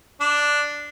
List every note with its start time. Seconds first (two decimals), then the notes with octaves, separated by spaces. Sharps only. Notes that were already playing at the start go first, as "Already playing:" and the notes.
0.20 D4